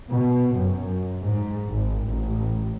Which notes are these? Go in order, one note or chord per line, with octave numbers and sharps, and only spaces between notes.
B2
F#2
G#2
G#1
A1